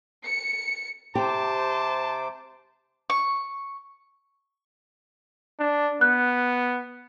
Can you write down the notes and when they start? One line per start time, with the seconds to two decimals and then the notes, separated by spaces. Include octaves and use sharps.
0.23 C#7
1.15 C3 G4 C5 A5 D6
3.10 C#6
5.60 D4
6.01 B3 F#6